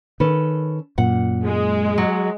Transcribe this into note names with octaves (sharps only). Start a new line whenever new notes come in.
D#3 C#4 A4 B4
F#2 A#2 F#5
G#3
F#3